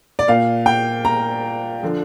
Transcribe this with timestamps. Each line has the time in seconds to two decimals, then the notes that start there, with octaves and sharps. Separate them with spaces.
0.19 D5
0.28 A#2 A#3 F5
0.66 G5
1.05 A#5
1.83 D3 F3